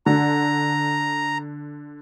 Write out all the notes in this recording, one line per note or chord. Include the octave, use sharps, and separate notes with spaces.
D3 A#5